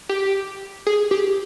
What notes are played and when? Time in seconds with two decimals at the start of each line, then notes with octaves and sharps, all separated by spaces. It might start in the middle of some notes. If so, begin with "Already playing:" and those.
0.09 G4
0.87 G#4
1.11 G4